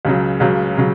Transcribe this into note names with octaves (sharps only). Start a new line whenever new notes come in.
C#2 C#3 F#3
C#2 C#3 F#3
C#3 F#3